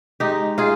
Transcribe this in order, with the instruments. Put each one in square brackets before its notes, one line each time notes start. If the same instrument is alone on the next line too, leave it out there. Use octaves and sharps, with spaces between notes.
[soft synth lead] G#3 [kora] D#4 G4
[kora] F4 G#4